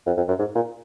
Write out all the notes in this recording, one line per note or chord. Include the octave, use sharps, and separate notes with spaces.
F2
F2
F#2
G#2
A#2